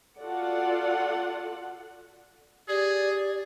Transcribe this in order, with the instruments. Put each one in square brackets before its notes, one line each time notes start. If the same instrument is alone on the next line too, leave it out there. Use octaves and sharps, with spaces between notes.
[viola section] F4 F#4 A4 D5 F#5
[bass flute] G4 [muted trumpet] G#4 [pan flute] D5